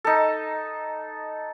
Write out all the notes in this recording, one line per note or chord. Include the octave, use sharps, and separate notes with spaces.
D#4 A4